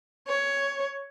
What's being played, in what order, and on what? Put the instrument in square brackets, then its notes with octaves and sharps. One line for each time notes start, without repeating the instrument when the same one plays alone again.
[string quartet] C#5